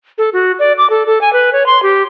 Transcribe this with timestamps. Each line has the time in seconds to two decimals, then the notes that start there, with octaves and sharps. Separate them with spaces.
0.18 A4
0.33 F#4
0.59 D5
0.78 D6
0.90 A4
1.07 A4
1.21 G#5
1.33 B4
1.53 C#5
1.66 C6
1.82 G4